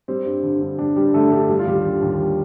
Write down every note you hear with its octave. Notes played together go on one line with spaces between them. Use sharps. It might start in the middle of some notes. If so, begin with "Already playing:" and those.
G3 C4
G2
D3
G2
G3 D4
G2 G3 G4
D3 A3 A4
G2 G3 G4
G3 G4
F4
D#2 G3 G4
D3
D#2
G3